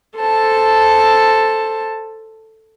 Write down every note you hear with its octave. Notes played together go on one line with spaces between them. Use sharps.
A4 C5 A5